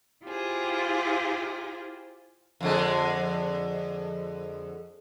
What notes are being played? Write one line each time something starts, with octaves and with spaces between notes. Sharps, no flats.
E4 F4 G4 G#4 C5
F2 D3 G#3